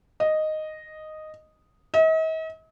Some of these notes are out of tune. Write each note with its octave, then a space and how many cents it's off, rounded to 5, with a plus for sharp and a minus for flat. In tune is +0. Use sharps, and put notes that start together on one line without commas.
D#5 -5
D#5 +45